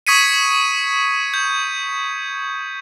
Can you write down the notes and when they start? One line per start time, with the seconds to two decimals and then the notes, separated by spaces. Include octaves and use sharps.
0.07 C#6 D#6 G#6 B6 C#7 D#7
1.34 G6